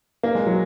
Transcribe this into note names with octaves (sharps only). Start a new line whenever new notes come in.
A#3
G#3
F#3